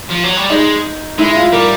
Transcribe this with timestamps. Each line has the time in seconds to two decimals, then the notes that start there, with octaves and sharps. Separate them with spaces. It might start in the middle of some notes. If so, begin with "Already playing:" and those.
0.10 F3
0.23 F#3
0.37 G3
0.50 G#3 D#4
1.18 G#3 E4
1.36 F4
1.52 G3 A#4